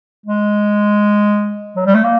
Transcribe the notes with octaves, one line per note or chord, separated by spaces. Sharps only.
G#3
F#3
G3
A3
A#3